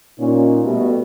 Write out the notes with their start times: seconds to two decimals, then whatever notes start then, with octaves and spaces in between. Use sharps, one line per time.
0.20 A#2 C#4 D#4
0.63 B2 G3 A3